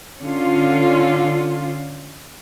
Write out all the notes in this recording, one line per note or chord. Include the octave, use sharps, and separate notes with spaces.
D3 C#4 F4